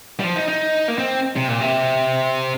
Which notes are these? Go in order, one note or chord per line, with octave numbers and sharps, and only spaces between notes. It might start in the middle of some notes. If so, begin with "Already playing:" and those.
G3
F3
D#4
D#4
A#3
C4
C3
A#2
C3